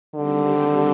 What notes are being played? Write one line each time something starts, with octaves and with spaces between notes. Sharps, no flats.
D3 D#3 G3 C4 G4